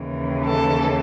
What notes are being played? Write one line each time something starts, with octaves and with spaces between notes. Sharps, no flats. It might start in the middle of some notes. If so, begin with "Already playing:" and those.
Already playing: D#2 C#3 E3
A4